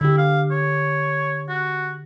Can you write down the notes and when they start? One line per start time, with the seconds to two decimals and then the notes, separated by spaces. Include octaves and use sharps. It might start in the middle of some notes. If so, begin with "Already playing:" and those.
0.01 D3 E4 G4
0.18 F5
0.51 C#5
1.49 F#4